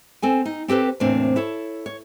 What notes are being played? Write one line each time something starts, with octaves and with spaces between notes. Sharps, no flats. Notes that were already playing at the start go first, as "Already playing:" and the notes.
C4 A4 G#5
D#4
C4 G4 A4 B4 C5
E2 A2 C3 A#3 C4 D4
E4 A4 C#5
C#5